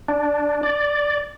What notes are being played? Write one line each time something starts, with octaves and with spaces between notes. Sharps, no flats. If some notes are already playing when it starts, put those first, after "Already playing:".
D4
D5